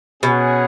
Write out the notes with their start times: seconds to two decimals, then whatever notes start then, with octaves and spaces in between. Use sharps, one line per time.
0.22 B2 C#4 G#4 C#5 F#5